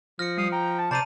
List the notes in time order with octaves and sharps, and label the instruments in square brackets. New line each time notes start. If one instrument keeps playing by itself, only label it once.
[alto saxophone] F3 [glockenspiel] F6 C#7 [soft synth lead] A#6
[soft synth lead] G3 [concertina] F5 D#6
[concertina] G5 [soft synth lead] A#5
[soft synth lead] A5
[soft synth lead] C3 [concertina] C5 D5 [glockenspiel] A5 A#5 D#7